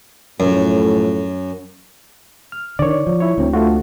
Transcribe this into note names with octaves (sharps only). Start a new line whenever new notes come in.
F#2 A2 F3 A3
F6
D3 D#3 C#5 D5
F3
E4 C#5
D2 C4
A3 F4 F#4